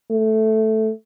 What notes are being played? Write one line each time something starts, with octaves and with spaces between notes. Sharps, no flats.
A3